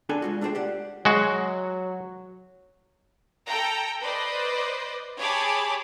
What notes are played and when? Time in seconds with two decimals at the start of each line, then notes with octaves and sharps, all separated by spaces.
0.09 D4 A4 G#5
0.22 G#3 F4 F#4
0.41 A3 D4 F4 G#4 C5 G5
0.55 G4 D5 F#5
1.05 F#3 G#3 F#4
3.46 A4 G5 A#5
4.01 B4 C5 D5 D#5
5.18 G4 G#4 C#5 A5 B5 D6